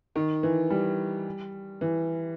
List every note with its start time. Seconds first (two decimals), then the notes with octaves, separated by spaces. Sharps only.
0.16 D#3
0.43 E3
0.70 G3
1.81 E3